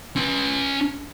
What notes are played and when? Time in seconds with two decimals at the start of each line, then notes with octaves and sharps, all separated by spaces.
0.16 C#4 C6